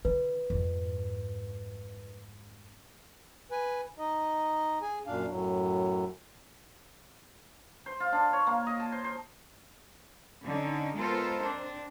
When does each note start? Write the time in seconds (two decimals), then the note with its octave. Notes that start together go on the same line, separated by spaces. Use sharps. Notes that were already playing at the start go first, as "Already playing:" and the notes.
0.05 D3 B4
0.50 F2 G#2
3.51 B4 G#5
3.99 D#4 D#5
4.82 G#4 G#5
5.07 F#2 A#2 D4 F5
5.29 F#2 A2 F#3
7.86 C5
8.00 F4
8.12 D4
8.33 C#5
8.47 A#3
8.67 D#5
8.80 A5
8.92 C5
9.04 C5
10.43 D3 C#4 D#4
10.95 G#3 B3 F4 A4 A#4 C5
11.42 C4 D4